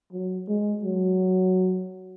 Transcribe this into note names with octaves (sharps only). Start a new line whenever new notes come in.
F#3
G#3
F#3